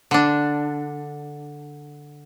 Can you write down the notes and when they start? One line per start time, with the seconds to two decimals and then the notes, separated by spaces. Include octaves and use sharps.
0.11 D3 D4